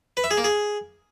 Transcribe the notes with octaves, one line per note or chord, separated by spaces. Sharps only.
B4
E5
G#4
A#3
G#4